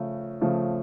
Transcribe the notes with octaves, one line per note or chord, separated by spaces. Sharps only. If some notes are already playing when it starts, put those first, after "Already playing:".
Already playing: C#3 F3 A3
C#3 F3 A3